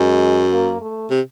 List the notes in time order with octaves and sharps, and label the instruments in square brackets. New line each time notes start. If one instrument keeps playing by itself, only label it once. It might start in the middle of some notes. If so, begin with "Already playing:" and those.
Already playing: [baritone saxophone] F#2 [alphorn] G#3
[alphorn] A#3
A3
[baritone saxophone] C3